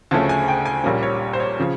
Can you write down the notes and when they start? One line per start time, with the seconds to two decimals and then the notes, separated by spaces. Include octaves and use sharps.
0.11 D2 C#3 F3 A3 C#4 A5
0.29 G#5
0.48 G5
0.66 G#5
0.84 A#1 A#2 G3 A#3 C#4
1.03 C#5
1.33 C5
1.40 C#5
1.60 C#3 F3